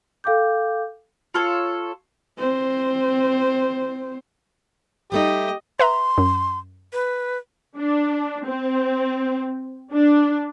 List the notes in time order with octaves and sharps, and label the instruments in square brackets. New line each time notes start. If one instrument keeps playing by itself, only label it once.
[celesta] A4 F5 G5 D6 G6
[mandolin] F4 A4 C#5
[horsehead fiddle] C4 C5
[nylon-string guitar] G3 A3 D#4 [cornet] G4 [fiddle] D#5
[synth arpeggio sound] B4 E5 A#5 [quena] C6
[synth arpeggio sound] F#2
[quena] B4
[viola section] D4
C4
D4